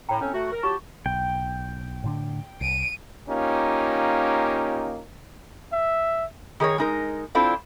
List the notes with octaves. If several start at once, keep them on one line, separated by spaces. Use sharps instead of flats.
A2 G5 A#5
A2 C4 C#4 C#5
A3 F#4
A#4
F#3 F4 G4 A5 C#6
B1 G5
A2 D3 D4
C2 D7 D#7
A#3 C#4 D#4 F4 G4
E5
D#3 G#4 A#4 C#5
G#3 D#4 A#4
C4 D4 E4 F4 A4 C5